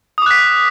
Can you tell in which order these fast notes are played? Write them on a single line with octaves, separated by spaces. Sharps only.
D#6 D6 F#6 B6